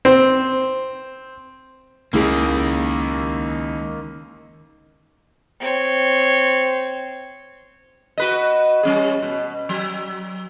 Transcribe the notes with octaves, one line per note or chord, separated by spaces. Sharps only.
C4
C#2 D#3 A#3 E4 G#4
C4 C#5
F#4 B4 D#5
G3 C#4 G#4
B2
F#3